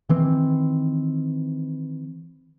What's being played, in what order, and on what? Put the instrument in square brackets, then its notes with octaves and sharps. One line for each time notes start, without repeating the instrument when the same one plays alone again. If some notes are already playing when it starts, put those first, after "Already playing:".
[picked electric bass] D#3 E3 C4